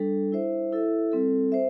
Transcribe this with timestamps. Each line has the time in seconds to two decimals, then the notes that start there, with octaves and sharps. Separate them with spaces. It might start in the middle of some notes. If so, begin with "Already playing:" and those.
Already playing: G3 D4 A4
0.32 E4 C5 E5
0.72 E4 A4 E5
1.12 G3 C4 A4
1.52 C5 E5